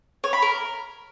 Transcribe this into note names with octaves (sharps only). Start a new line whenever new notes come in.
C#5
B5
A#4